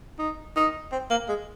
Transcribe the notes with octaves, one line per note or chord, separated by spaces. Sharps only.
D#4
D#4
C4
A#3
G#3